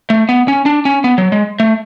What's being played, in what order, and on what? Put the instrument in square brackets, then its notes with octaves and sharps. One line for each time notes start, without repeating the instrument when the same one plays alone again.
[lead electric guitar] A3
B3
C#4
D4
C#4
B3
F#3
G#3
A3